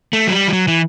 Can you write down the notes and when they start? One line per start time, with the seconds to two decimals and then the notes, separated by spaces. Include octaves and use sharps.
0.13 A3
0.27 F#3
0.32 G3
0.48 F3
0.53 F#3
0.68 E3